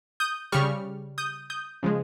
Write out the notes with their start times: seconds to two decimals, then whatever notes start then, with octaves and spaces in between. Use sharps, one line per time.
0.20 D#6 G6
0.52 C#3 G3 C#6 F6
1.18 D#6 G6
1.50 D#6 G6
1.83 C#3 F3 G#3